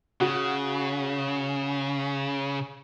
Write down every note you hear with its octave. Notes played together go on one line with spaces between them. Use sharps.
C#3 F#4